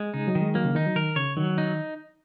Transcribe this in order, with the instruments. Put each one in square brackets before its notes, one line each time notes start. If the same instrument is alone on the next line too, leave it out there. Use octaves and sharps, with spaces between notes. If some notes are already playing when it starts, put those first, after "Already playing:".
Already playing: [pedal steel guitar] G#3
[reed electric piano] C#3 [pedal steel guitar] D#4
[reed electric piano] F#3
[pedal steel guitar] D#3
[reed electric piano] G#3
[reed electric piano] F#3 [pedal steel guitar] A#3
[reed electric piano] C#3
[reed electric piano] D#3 [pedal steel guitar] D#4
[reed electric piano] F#3
[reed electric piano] D#3 [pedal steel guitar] A#4
[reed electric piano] C#3 [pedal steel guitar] C#5
[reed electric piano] D#3 [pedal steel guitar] F#3
[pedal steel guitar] D#4